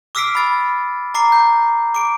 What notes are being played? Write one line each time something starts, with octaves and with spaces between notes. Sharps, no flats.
D6 E6 F6 B6 C7 D7
B5 A6
A#5 D6 C7
G6
D6 D7